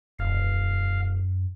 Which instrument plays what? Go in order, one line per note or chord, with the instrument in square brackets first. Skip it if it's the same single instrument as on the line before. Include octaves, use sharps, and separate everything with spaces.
[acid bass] E1 [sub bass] F#2 [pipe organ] F5